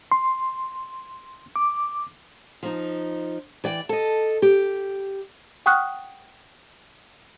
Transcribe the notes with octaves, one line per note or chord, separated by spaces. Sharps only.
C6
D6
F3 D#4
E3 D5 G5
A4 D#5
G4
F#5 G5 C#6 D#6 F6 F#6